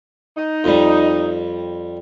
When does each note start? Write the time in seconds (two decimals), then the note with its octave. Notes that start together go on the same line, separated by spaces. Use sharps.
0.37 D#4
0.64 F2 G3